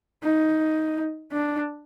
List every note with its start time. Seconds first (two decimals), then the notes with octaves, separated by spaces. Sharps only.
0.23 D#4
1.33 D4